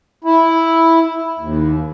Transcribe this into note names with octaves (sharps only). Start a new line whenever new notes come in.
E4
D#2